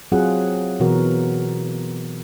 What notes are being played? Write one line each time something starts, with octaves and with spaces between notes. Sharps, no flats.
F#3 C4 F4 G#4 F#5
B2 E3 F#4 A#4